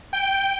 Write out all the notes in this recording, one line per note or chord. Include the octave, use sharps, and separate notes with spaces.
G5